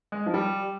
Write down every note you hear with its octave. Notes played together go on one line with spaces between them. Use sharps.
G#3
F3
G3